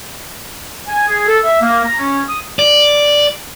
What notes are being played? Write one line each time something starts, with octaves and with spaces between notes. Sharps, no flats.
G#5
G#4
A4
E5
A#3
A#5
C#4
D#6
D5